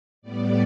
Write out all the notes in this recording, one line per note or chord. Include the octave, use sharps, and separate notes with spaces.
A2 G3 B3 D5